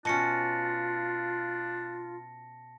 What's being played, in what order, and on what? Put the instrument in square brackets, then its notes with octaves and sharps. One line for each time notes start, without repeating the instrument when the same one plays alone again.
[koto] B2 C#4 [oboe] D4 [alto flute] F4 [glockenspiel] A5 A#6 C#7